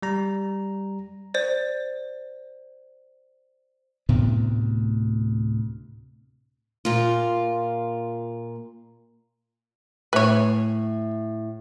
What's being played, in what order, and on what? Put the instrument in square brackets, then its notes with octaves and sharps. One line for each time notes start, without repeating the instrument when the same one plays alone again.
[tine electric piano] G3 A#5
[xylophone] C5 D5
[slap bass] D2 A2 C3 B3
[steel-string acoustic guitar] A#2 F4
[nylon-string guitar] A2 E5 G#5 [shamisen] B4 C#5